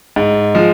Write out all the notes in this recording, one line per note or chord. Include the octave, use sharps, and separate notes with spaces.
G#2
F3 G#3